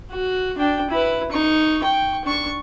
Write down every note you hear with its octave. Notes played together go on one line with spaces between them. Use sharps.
F#4
D4 G5
E4 B4
D#4 C#6
G5 C#6
D4 C#6